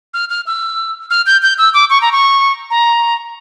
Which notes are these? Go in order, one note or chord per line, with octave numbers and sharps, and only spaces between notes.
F6
F6
E6
F6
G6
G6
E6
D6
C#6
A#5
C#6
A#5